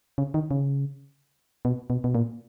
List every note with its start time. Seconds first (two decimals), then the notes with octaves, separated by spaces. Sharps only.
0.18 C#3
0.34 D#3
0.51 C#3
1.65 B2
1.90 B2
2.04 B2
2.15 A#2